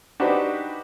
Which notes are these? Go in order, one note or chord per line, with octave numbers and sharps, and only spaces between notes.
D4 D#4 F#4 G4 B4 C5